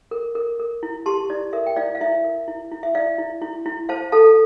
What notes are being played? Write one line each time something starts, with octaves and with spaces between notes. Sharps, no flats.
A#4
A#4
A#4
E4
G4 A5 C6
E4 D5
A#4 E5
G5
E4 D5 F5
F5
E4 E5
A#4
E4
E4
E5
E4 D5 F5
E4
E4
E4
C5 F5 A5
A4 F5 A5